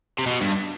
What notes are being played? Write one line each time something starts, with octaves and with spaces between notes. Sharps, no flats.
C3
B2
G2